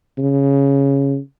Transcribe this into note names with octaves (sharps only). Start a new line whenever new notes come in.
C#3